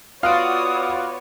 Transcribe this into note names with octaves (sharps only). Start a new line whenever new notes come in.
B3 F4 F#4 C#5 D5 F5 D#6